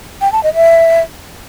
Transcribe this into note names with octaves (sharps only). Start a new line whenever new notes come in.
G5
A5
D#5
E5